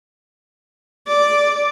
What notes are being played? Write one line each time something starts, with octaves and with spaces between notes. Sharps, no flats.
D5